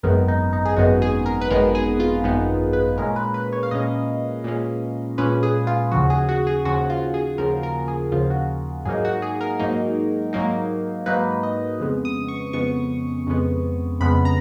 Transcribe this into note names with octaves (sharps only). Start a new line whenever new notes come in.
G#1 F#2 D#3 G#3 B3 A#4
D#4
D#4
G#4
G#1 F#2 D#3 G#3 B3 F#4
G#4
A#4
B4
G#1 F#2 D#3 G#3 B3 A#4
G#4
F4
G#1 F#2 D#3 G#3 B3 D#4
B4
A#2 G#3 C#4 A#4
B4
B4
C#5
F5
A#2 G#3 C#4 D#5
A#2 G#3 C#4
A#2 G#3 C#4 B4
G#4
F4
D#2 C#3 F3 F#4
G#4
F#4
G#4
D#2 C#3 F3 F#4
F4
G#4
D#2 C#3 F3 A#4
A#4
G#4
D#2 C#3 F3 F4
F#4
G#2 F#3 A#3 D#4 G#4
F#4
G#4
A#4
G#2 F#3 A#3 D#4
G#2 F#3 A#3 D#4
G#2 F#3 A#3 D#4 B4
D#5
F2 C#3 G#3 B3
D#6
C#6
F2 C#3 G#3 B3 C#6
F2 C#3 G#3 B3
F2 C#3 G#3 B3 B5
A#5